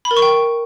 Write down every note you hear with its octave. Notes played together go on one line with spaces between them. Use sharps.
B5
A#4
C#6
G5